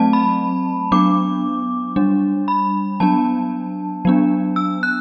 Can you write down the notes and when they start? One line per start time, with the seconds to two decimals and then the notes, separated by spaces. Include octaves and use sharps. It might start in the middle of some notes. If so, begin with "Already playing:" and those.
Already playing: F#3 A3 C4 A5
0.13 B5
0.92 F#3 B3 D4 D6
1.96 G3 D4
2.48 B5
3.00 F#3 B3 D4 A5
4.05 F#3 B3 D4
4.56 E6
4.83 F#6